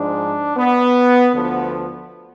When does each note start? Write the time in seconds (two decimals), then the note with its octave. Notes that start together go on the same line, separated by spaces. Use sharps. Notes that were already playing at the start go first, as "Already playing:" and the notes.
Already playing: G#2 F3 D4
0.57 B3
1.33 D2 D3 F3 B3